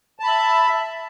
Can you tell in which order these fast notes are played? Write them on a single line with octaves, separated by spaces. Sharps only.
A5 B5 E5